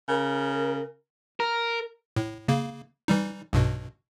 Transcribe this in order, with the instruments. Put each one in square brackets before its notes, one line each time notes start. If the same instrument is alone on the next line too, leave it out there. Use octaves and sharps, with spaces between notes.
[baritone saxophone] C#3 [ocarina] A#4
[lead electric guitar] A#4
[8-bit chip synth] A2
C#3 A#3
E3 G3 D#4
B1 G2 B2